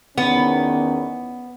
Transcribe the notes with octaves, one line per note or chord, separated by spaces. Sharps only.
E2 D#3 B3 C#4